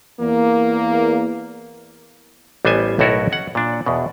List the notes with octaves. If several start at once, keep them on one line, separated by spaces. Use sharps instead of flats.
E2 A#3
A1 G3 B3 C5 G#5
B1 A2 E4 F#4 A4 A#4
C#4 F#5
A#2 D4
E2 B2